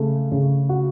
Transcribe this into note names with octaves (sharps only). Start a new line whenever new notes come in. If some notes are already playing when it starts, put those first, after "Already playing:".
Already playing: C#3 A3
C#3
F#4